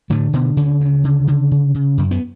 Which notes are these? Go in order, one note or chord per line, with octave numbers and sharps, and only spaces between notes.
A2 D3 A3
B2 D3 B3
D2 C#3 C#4
D2
D3
D3
C#3
C#3
F#2
B3